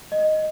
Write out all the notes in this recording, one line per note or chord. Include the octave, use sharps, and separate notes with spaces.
D#5